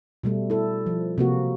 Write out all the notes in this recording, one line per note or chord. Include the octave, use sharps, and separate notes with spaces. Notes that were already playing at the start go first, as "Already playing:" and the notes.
B2 G3 A3
E4 A4
F3
C3 A#3 F#4